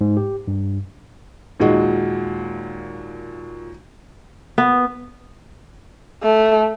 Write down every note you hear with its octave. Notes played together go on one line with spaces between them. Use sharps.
G#2
G4
G2
D#2 A#2 G#3 F#4 D#5
B3
A3